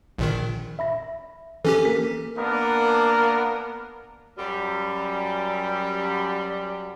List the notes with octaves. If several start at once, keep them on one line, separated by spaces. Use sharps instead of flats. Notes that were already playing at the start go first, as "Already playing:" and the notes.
A#1 A#2 D#3
E5 B5 A#6
E3 C#4 G4 A4
A#3 A#4 B6
A#3 B3 D4 A#4
F#2 G3